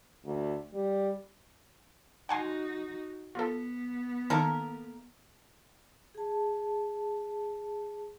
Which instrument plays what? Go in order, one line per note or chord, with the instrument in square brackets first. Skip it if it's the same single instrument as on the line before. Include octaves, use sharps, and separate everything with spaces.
[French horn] D2
G3
[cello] D#4 F#4 [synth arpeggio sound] F#5 G#5 C6
[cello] B3 [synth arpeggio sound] F4 A4
[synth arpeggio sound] D#3 [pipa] A#3 A4 A#4
[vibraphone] G#4 A5